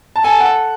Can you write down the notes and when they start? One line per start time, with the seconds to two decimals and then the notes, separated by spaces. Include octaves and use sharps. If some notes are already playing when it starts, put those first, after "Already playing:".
0.16 A5
0.24 A4 G#5
0.40 F#5